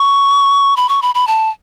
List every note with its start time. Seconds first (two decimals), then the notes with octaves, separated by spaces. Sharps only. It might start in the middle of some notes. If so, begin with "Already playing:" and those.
Already playing: C#6
0.77 B5
0.89 C#6
1.02 B5
1.15 B5
1.27 A5